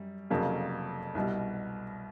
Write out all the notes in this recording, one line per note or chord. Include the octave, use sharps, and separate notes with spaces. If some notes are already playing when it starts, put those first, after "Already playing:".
Already playing: F#2 G3
F1 F2 C#3 F#3 A#3
C2 B2 G3